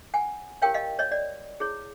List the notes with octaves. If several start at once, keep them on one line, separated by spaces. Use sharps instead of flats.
F#5 G#5
E4 G4 A#4 C#5 F5 G5
D#5 F5
C#5 D#5
D5
E4 G#4 C#5